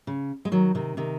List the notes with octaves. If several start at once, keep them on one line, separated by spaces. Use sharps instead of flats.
C#3
G#3
D#3 F#3
C3 D#3
C3 D#3